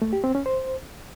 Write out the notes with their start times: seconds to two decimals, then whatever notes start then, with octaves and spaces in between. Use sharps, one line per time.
0.02 A3
0.13 G4
0.24 C4
0.35 C#4
0.46 C5